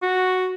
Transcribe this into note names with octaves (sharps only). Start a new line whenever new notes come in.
F#4